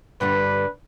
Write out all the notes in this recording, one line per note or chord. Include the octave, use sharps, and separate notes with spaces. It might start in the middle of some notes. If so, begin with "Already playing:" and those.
G2 D3 G3 B4